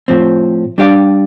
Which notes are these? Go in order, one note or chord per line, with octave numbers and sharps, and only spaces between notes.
A2 F3 C4
G3 D4 G4 D5 F5